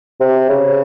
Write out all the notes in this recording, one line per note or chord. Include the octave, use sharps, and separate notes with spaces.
C3
C#3